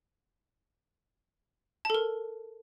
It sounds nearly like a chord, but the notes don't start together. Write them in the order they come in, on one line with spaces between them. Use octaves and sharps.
A5 A4 A#4